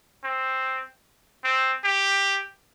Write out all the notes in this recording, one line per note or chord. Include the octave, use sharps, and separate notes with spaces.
C4
C4
G4